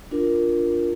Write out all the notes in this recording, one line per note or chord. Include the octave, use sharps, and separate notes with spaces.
D4 F4 A#4